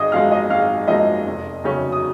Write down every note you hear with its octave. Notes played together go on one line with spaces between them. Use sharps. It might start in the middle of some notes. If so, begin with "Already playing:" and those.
Already playing: G#1 D#5 D#6
F#2 F3 G#3 F5 F6
D#5 D#6
G#1 F5 F6
F#2 F3 G#3 D#5 D#6
F1
D#2 C#3 F#3 C#4
D#6